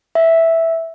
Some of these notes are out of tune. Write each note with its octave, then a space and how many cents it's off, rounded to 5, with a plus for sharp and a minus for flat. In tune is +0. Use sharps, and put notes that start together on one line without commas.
E5 -5